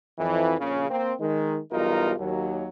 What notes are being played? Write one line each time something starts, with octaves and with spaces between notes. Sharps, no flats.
F2 E3
A#1 C#3
A#3 C4
D#3 G#3
B1 E2 G3 D#4 F4 A#4
D#2 F#3